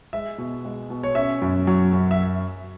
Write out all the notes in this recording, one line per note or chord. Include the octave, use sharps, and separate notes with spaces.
G#3 E5
B2
G#3
B2
C#5
C#4 E5
F#2
F#3
F#2
E5